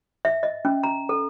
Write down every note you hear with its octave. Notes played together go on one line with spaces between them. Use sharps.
E5
D#5
C#4
A#5
A4